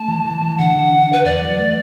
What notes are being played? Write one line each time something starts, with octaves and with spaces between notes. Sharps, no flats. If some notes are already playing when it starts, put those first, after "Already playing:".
Already playing: A3 A5
E3
E3
E3
D3 F#5
D3
D4
D3 B4
E2 D5
F#3
A3